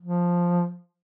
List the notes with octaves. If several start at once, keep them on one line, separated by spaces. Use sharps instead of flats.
F3